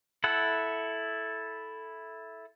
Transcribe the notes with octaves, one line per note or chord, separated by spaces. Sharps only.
E4 A4 F#5